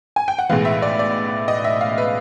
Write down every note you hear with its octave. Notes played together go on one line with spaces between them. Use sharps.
G#5
G5
F#5
B1 A2 E3 G#3 F5
E5
D5
D5
D#5
E5
F5
B4